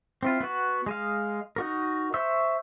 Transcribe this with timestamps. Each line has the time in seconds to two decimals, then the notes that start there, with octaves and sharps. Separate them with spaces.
0.23 C4 E4 F4
0.40 B3 F#4
0.86 G#3 D#5 F5
1.56 D#4 F#4 A#4
2.14 C5 E5 C#6 E6